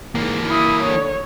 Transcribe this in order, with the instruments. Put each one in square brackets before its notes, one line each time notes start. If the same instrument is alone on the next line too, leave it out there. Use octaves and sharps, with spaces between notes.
[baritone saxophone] G#2 [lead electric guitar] E3 A#3
[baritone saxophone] E4 [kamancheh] B5 D#6
[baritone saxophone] D3 [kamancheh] C#5